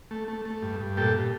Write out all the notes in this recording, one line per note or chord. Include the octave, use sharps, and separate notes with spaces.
A3
A3
A3
G2
G2
A#2 G4 A4
A#2